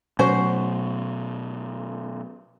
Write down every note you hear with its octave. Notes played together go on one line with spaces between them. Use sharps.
B2 F#3 A3 C#4 F#4 C5